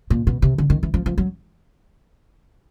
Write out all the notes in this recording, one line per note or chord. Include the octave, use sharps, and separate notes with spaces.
A#2
B2
C3
D3
D#3
E3
F3
F3
F#3